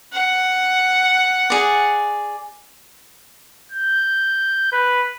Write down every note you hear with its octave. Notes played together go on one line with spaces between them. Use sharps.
F#5
G#4 D5
G6
B4